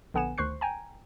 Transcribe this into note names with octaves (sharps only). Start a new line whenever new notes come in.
A#1 D3 B3 F#5 G#5 E7
D2 D#3 C5 C#6 F#6 C7
G5 G#5 A#5